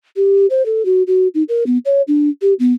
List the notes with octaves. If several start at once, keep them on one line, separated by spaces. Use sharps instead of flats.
G4
C5
A4
F#4
F#4
D#4
A#4
B3
C#5
D4
G4
B3